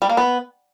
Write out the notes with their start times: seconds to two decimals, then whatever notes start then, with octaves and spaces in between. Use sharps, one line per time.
0.02 G3
0.09 A#3
0.17 B3